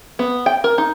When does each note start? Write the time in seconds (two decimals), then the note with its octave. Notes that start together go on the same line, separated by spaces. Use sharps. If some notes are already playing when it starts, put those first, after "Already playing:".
0.19 B3
0.46 G5
0.64 A#4
0.78 D#4